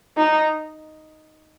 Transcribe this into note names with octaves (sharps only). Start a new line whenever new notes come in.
D#4